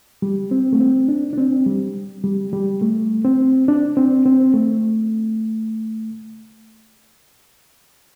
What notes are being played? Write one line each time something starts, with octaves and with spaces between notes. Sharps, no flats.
G3
C4
A3
C4
D4
D4
C4
G3
G3
G3
A3
C4
D4
C4
C4
A3